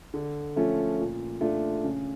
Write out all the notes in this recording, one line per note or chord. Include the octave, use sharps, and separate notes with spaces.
D3
F3 A3 C#4 F4
A#2
A3 D4 F4
C#3